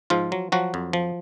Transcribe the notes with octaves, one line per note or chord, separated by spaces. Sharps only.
G#2 F3 F4
F#3
F3 F#3 F#4
F2
F3